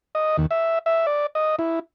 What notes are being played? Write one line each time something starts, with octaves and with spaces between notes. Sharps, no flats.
D#5
D#2
E5
E5
D5
D#5
E4